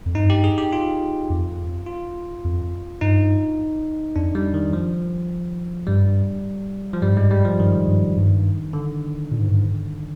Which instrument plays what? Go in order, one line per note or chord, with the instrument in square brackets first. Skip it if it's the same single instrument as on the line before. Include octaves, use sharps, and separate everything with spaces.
[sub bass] F2
[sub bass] G2 [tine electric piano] D#4
[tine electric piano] G4
G#4
G4
F4
[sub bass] F2
[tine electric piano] F4
[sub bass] F2
[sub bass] G2 [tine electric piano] D#4
[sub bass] F2 [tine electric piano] D4
[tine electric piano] G3
D#3
F3
[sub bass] G2 [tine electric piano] G3
[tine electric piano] F3
[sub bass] G2 [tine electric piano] G3
[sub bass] G#2
[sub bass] G2 [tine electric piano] G#3
[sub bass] G#2
[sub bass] G2 [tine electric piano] G3
[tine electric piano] F3
[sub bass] G2 [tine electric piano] D#3
[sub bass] G2
G2
[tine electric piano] D3
[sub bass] A#2
G#2
G2
G#2